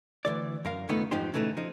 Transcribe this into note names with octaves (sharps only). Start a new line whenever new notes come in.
D2 C3 E3 D5
F#2 A#4 F5
C#2 D#3 A3 B3 D#4 F#5
F2 G#2 F3 D#4 G4 C5
C#3 E3 A3 C#4 D#4
F3 D#4